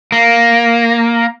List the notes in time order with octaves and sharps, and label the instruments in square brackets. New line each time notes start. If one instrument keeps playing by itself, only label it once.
[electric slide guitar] A#3